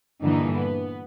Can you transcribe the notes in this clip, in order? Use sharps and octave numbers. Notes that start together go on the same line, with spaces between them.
G2 A#2 D3 E3 D#4
B3